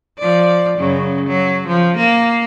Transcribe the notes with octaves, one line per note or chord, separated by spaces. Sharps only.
F3 D5
F#2 C#3 F#3
F#3
F3
A#3